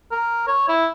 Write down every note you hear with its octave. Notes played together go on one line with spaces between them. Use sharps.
A#4
C#5
E4